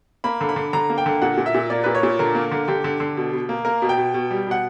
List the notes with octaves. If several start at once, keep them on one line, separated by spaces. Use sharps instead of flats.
A#3 B5
D3
B5
D3
D3 A#5
A#3
G5
D3
A#2 F#5
A#2
E5
A#2
A#3 D5
A#2 B4
C#5
A#2
D3 A#4
A#3
D3
D3 G4
D3
D3
B2
B2
A#3
A#3 A#4
B2
G5
B2
B2
G3
B2 F#5